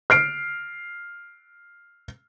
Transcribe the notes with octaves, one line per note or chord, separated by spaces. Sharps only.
F6 C7 D7